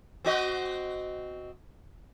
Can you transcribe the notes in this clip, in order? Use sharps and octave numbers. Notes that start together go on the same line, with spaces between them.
C4 F#4 D#5